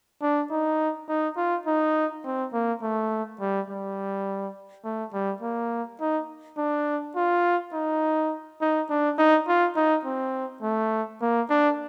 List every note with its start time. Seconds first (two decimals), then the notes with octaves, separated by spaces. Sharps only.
0.22 D4
0.51 D#4
1.08 D#4
1.37 F4
1.67 D#4
2.25 C4
2.53 A#3
2.82 A3
3.40 G3
3.69 G3
4.84 A3
5.13 G3
5.42 A#3
6.01 D#4
6.58 D4
7.16 F4
7.73 D#4
8.61 D#4
8.89 D4
9.18 D#4
9.48 F4
9.76 D#4
10.05 C4
10.62 A3
11.21 A#3
11.50 D4